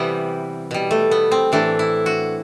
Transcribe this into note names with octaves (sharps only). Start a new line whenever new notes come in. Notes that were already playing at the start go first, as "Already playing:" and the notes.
Already playing: C3 E3 G3 B3
B2 G3
A3
B3
C4
A2 E3 A3 D4
E4
F#4